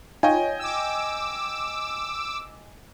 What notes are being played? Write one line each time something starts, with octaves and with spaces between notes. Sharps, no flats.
D#4 F4 C#5 D#5 G5 G#5
D6 E6